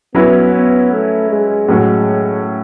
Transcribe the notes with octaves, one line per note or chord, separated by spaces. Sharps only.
F#3 B3 C#4 E4 B4
B3
A3
G#3
A2 F#3 G#3 C#4 F#4